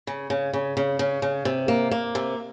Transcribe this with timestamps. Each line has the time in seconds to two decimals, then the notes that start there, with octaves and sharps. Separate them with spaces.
0.07 C#3
0.30 C#3
0.53 C#3
0.77 C#3
0.99 C#3
1.22 C#3
1.45 C3
1.68 A#3
1.91 A#3
2.15 C3